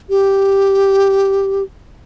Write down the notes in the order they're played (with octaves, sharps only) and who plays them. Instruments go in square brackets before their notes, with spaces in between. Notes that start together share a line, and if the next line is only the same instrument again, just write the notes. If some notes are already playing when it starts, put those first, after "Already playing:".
[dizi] G4